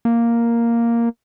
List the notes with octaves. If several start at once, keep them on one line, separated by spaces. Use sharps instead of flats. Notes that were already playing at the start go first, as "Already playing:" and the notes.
A#3